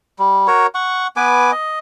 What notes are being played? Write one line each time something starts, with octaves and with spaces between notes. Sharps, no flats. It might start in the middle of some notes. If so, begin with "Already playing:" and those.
G3
F#4 A#4 C#5
F#5 C#6
B3 B4 G#5 D6
D#5